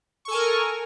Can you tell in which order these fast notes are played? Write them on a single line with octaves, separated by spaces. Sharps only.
C#6 A4 G#5 A#4